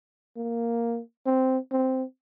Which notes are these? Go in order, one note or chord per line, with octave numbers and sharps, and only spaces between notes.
A#3
C4
C4